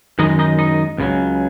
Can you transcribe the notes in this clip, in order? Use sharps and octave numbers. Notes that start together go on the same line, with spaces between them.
F#2 D#3 G#3 D#4 D#5
D#4 D#5
D#4 D#5
C#2 C#3 F#3